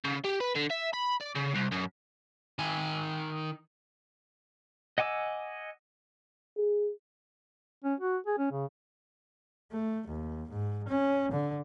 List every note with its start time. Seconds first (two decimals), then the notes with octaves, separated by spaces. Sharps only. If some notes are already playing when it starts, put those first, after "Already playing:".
0.05 C#3
0.25 G4
0.40 B4
0.55 D3
0.70 E5
0.93 B5
1.21 D5
1.36 C#3
1.56 C2
1.72 F#2
2.59 D#3 G#5
4.98 D#5 F#5 G#5 D6 E6
6.57 G#4
7.84 C#4
8.00 F#4
8.27 G#4
8.38 C#4
8.51 C#3
9.72 A3
10.08 D#2
10.50 G#2
10.89 C#4
11.32 D3